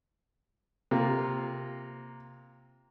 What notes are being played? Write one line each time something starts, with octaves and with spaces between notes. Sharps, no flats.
C3 A#3 F4